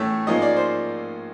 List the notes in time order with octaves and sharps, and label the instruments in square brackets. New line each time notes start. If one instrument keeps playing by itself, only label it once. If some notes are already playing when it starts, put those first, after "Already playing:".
Already playing: [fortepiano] A2 E3 A3 C#4
G#2 F3 A#3 C#4 D#5
D5
C5